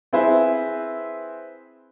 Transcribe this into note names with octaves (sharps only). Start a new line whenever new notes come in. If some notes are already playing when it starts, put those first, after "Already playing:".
C4 E4 G#4 B4 C5 E5